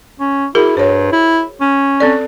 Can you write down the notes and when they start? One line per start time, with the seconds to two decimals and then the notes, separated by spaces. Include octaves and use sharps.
0.20 C#4
0.55 E4 F#4 G#4 A#4
0.77 G2 C5 C#5
1.12 E4
1.61 C#4
2.00 C4 A4 D5